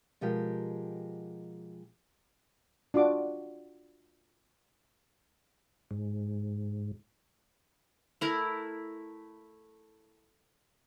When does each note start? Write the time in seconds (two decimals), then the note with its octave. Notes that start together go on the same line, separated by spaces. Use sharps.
0.21 B2 F3 G#3 G4 A#4
2.94 D4 F4 F#4 D6
5.91 G#2
8.21 A3 E4 A#4